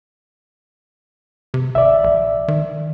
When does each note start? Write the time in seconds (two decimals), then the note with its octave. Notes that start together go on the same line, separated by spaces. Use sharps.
1.54 C3
1.75 G#1 D5 E5
2.04 A#1
2.48 D#3